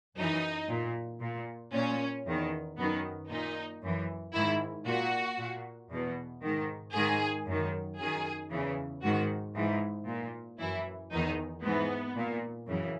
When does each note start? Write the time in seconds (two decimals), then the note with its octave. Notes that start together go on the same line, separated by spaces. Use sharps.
0.17 F#2 E3 D#4
0.69 A#2
1.21 A#2
1.73 A#2 C#4
2.26 E2 D#3
2.77 F#2 D#3 B3
3.30 A#2 D#4
3.81 F#2 E3
4.33 G#2 D#3 E4
4.86 A#2 F#4
5.38 A#2
5.91 E2 B2
6.42 G#2 D#3
6.94 G#2 D#3 G#4
7.46 F#2 D#3
7.98 F#2 D#3 G#4
8.50 E2 C#3 E3
9.02 G#2 D#3 F#4
9.55 G#2 E3
10.07 A#2
10.59 F#2 E3 E4
11.12 E2 D#3 D#4
11.63 G#2 E3 B3
12.16 A#2
12.67 F#2 C#3 E3